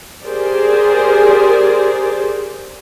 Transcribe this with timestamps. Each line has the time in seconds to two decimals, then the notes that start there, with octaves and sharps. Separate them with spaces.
0.24 G4 G#4 A#4 C5 D5